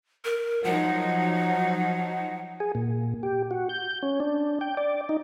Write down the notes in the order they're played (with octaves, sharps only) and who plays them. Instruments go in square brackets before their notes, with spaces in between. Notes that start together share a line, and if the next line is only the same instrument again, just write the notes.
[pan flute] A#4
[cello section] F3 F#3 D#4 [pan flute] F#5
[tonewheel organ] G#4
A#2
G4
F#4
G6
C#4
D4
G5
D5
D#4